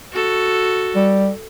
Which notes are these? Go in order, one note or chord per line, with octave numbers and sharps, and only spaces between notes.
F#4 A4
G3